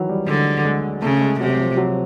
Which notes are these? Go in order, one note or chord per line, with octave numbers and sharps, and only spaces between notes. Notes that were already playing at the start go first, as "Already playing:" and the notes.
Already playing: D#3 E3 F#3
G3
D3 G#3
G#3
C#3 A3
G#3
C3 F#3
F3
F#3